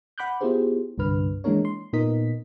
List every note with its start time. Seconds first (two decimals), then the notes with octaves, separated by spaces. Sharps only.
0.18 F#5 B5 D6 F#6 G6
0.41 B3 E4 F4 G4 G#4 C5
0.98 C2 G2 D3 B4 F6
1.44 E3 G#3 A#3 D4 A#4 C#5
1.65 C6
1.93 A#2 B3 D#4 A#4 D#5 B6